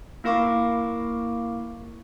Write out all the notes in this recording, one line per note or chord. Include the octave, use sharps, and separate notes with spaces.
A#3 E4 A#4 F5 C#6 D6